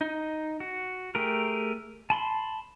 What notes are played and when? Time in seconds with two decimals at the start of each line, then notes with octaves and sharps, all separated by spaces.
0.01 D#4
0.60 F#4
1.15 A3 G4 G#4 A#4
2.10 A5 B5 C6